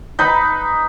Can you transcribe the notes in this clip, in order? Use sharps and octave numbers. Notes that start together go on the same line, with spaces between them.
D#4 B4 B5